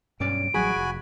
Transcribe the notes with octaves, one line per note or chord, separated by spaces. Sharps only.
B1 G2 C#4 D5 D7
A1 F#3 G3 F#4 G#4 G#5 B5
F1